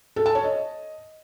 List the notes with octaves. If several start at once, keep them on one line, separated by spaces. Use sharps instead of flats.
A4
A5
C#5
D#5